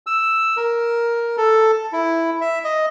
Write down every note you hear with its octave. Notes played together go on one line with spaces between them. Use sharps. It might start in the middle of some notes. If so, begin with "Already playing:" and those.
E6
A#4
A4
E4
E5
D#5